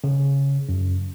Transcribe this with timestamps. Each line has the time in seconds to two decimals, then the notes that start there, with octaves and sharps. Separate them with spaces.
0.04 C#3
0.69 F#2